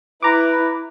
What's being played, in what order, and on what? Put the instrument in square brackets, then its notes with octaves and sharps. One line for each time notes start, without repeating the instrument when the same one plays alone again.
[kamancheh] E4 [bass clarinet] B4 [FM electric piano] A#5 D6